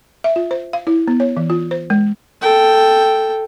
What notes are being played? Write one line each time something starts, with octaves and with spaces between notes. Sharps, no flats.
E5
F4
C5
F5
E4
B3
C#5
E3
F4
C5
G#3
A4 G5